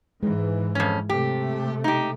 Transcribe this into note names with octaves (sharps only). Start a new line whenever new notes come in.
G#2 E3 G#3
F2 C#4
C3 A3 G4
D#4 G4